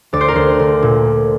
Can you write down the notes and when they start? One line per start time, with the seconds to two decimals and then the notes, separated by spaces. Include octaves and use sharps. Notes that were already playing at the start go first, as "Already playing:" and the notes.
0.13 D2 D5
0.21 C5
0.28 A#4
0.35 D2 C5
0.59 D3
0.82 A#2